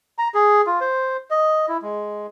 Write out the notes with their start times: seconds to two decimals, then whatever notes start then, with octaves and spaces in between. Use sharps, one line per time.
0.18 A#5
0.34 G#4
0.66 F4
0.81 C5
1.30 D#5
1.68 E4
1.82 G#3